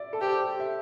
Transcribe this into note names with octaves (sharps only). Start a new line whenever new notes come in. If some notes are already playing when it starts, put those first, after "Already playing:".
Already playing: D5 E5
A4
G4 C5
E5